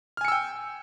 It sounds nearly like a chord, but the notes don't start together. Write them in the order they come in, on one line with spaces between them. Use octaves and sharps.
F6 G#5 C#7 E6 G5